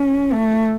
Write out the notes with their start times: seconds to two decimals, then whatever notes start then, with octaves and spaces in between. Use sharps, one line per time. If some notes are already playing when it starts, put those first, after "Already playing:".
Already playing: C#4
0.33 A3